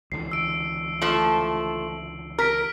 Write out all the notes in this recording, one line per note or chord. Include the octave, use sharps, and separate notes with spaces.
C#2 D3 E3 C7
E6 D7
F3 A3 F#7
A#4 F6 B6 D7